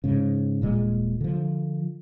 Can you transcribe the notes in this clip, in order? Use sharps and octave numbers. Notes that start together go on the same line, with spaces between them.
G#2 C#3
D#1 A#2 G#3
D3 F3